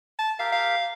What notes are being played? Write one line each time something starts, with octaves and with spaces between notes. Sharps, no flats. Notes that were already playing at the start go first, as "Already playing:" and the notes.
A5
G4 A#4 E5 F5
F5